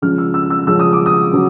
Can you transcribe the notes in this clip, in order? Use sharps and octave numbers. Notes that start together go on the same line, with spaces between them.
C#3 F3 G#3 C#4 F6
E6
E6
E6
C#3 F3 G#3 C#4 E6
D#6
D6
D#6
C#3 F#3